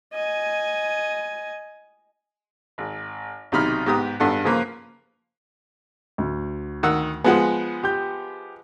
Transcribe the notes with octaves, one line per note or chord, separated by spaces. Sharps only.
D#5 G#5
G#1
B1 C3 D#4 B5 F6
G#2 B3 G4 A#5 D#6
G#1 G2 B3 A4 F#5
C#3 F3 A#3 B4
D2
D#3 F#5 E6
F3 G#3 B3 F#5 G#5
G4 G6